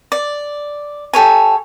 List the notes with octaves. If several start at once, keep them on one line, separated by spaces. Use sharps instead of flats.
D5
G4 A4 C#5 G#5